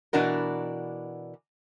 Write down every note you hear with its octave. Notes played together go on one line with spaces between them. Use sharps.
B2 E3 D4 F#4 A#4